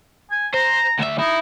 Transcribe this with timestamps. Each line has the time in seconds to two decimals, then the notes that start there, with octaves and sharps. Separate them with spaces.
0.31 G#5
0.54 C5 A#5
0.99 D2 E5
1.18 D#4 E4